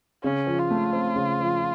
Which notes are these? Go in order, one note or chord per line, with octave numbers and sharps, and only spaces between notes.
C#3 C#4
F3
F4
A3
C4
C#3
F3